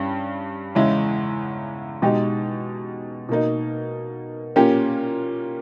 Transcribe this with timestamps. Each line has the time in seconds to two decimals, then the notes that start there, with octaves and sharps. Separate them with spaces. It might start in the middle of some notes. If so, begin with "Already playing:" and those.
Already playing: G2 G3 C#4
0.75 E2 C#3 G#3 C#4 E4
2.02 B2 G#3 D#4 G4
3.29 B2 A#3 D#4
4.56 A#2 A#3 C#4 G4